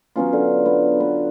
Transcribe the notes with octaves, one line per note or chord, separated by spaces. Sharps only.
F#3 B3 C#4 F4
D3
B3
B3